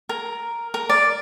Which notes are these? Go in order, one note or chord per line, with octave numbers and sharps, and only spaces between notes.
A#4
A#4
D5